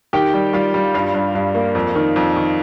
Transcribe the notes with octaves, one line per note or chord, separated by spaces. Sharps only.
D#3 G4 G5
G3
G3 F4 F5
G3
G2 F4 F5
G2
G2
A#3
F2
D#3
F2
D#3